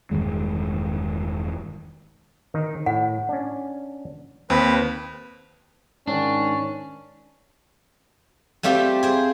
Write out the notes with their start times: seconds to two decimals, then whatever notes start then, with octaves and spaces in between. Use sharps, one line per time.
0.11 E1 G2 D#3 G#3
2.54 D#3 D#4
2.86 A2 F#5
3.29 C#4 D4
4.50 D#2 C4 B4
6.07 G#2 D#3 C#4 D4
8.63 G3 A3 C4 F4 G4
9.03 G#4 C5